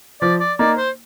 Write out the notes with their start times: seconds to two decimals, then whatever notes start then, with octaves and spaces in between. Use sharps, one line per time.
0.21 F3 D5
0.40 D5
0.58 A#3 D#4 D5
0.77 C5